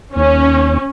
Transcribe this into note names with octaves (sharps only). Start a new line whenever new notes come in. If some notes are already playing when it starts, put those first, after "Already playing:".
D#2 C#4